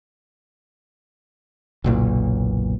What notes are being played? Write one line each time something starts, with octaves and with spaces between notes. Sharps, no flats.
F#1 B1 A#2